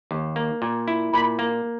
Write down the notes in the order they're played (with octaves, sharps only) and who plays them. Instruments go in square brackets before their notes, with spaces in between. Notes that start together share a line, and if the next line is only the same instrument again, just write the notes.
[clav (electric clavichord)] D#2
A#3
A#2
E4
[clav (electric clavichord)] A#2 [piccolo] B5
[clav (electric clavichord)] A#3